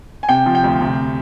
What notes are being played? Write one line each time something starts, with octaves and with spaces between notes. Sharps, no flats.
G#5
C3 G5
F3
G5
D2
C3